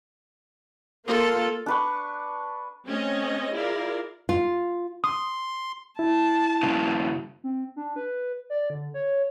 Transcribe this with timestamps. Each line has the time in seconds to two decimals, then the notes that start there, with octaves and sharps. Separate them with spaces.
1.08 A#3 F4 A4
1.66 D4 B4 C#6
2.88 A3 C4 C#4 C#5 D#5
3.55 E4 F4 G#4 A#4 D5 F5
4.29 F4
5.04 C6 D#6
5.99 E4 A5
6.63 G2 C#3
7.44 C4
7.76 D4
7.96 B4
8.50 D5
8.70 D3
8.94 C#5